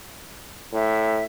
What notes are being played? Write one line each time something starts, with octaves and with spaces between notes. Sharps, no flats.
A2 E5